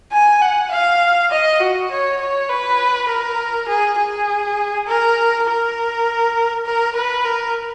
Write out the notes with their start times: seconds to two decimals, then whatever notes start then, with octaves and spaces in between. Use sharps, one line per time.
0.12 G#5
0.42 F#5
0.71 F5
1.31 D#5
1.60 F#4
1.91 C#5
2.20 C#5
2.49 B4
3.09 A#4
3.68 G#4
3.98 G#4
4.87 A#4
5.47 A#4
6.65 A#4
6.95 B4
7.25 A#4